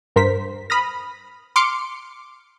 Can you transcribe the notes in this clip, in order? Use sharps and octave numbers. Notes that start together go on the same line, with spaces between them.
G2 A#4 C5 B6
B5 D#6 F6 A#6
C6 D6 F6 C#7